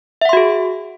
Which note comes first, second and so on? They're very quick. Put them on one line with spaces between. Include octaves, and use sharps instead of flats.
E5 F#5 C6 F#4 G#4